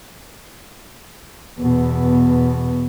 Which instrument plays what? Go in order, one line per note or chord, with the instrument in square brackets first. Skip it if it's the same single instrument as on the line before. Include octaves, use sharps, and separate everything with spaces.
[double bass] E2 B2